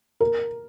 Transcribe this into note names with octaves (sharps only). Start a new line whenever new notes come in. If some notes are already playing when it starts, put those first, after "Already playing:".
A#4